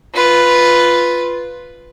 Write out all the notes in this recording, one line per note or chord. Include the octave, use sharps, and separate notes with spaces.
F4 B4